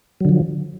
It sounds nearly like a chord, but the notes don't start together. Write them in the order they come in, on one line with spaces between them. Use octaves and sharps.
F#3 D3 F3